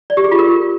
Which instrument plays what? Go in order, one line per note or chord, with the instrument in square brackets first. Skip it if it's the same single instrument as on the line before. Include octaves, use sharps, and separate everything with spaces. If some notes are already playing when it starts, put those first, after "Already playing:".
[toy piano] D5
G4
G#4
F4
A#4